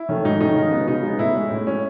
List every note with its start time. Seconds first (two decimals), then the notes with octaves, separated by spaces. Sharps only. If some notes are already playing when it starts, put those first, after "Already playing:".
Already playing: E4
0.09 D#3 A3 C#4
0.25 G#2 D#4
0.41 D#3 A3 C#4 D#4
0.56 C#3
0.72 G#3 B3
0.88 C#3 D#4
1.03 G#3 B3
1.19 A2 E4
1.35 G#3 C#4
1.50 A2
1.66 G#3 C#4